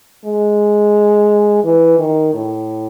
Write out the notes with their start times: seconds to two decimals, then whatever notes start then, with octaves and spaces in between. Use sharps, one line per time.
0.25 G#3
1.64 E3
1.99 D#3
2.34 A2